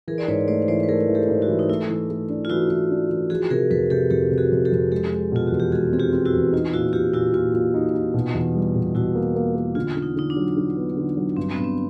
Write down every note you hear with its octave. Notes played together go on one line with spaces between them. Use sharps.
E3 G#4 A#4
D5
G#2 B4 C#5
A3 C5 D5
E3 C5 D5
B4
A3 G#4 A#4
E3
G4 A4
G#2
E4 F#4
E3
D#4
A3 E4
E3
A3
D4
F4
E3 E4 F#4
E3
D4
E3
F3 F#4 G#4
C3 G#4 A#4
F2 A4 B4
C3 G4 A4
F2 G4 A4
C3
F#4 G#4
F2
G4 A4
F2
G#3 G4 A4
G#3
B2 F4
E2 F#4
G4
G#3 F#4 G#4
C4 G#4
F4 G4
C4
E4 F#4
E2
D#4 F4
A#2 E4 F#4
A#2 F4 G4
A#2 E4 F#4
A#2 F4
A#2
D#4
D#4
B2
E2
G3
B2
B2 E4 F#4
A#3
A#3
A#3
D3 F4
D3
D#4
D3 D#4
D4
F#3
D3
B3
D3
F#3
G2 C4
B3
G2
C4